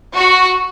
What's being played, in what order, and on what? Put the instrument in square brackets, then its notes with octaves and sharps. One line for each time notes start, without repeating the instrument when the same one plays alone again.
[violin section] F#4